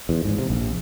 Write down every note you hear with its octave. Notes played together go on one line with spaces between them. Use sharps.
E2
G#2
C3
A#1